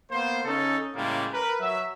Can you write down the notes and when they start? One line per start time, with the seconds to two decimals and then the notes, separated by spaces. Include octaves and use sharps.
0.10 A#3 B3 C5
0.44 C#3 C#4 D#4 A4
0.95 A2 C#3 G3 G#3 A#3
1.31 A#4 B4
1.60 F#3 E5